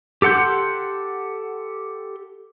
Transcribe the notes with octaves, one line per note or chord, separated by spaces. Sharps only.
G4 A4 F#5 C6 G6